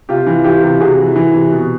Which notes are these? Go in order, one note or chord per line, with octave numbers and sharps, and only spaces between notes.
C3 F4 G4
E3
E3 F4 G4
C3
C3 F#4 G#4
E3
E3
C3
B2